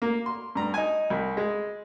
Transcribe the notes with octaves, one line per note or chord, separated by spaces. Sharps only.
A#3
C6
G2 A#5
D#4 G#5
C2
G#3